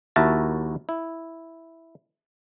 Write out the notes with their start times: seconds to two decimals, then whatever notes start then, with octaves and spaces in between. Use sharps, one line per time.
0.16 D#2 E4 F#4 A#4 E5 A5
0.89 E4